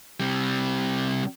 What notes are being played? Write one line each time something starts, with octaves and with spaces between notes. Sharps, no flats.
C3 G3